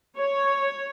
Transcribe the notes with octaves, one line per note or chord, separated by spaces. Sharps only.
C#5